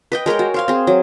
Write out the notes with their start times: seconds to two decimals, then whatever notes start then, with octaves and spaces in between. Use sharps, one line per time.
0.12 B4 D#5 G5
0.26 G#3 A#4 C#5 G5
0.39 F#4
0.54 C5 F5 G#5
0.68 C4 G#4
0.87 F#3